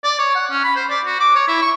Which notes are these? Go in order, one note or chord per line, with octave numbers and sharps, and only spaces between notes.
D5
C#5
F#5
C#4
B5
C5
D5
F#4
D6
C#5
E4
C#6